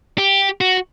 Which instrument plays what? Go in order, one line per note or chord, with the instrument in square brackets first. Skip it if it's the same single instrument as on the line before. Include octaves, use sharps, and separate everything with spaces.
[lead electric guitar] G4
F#4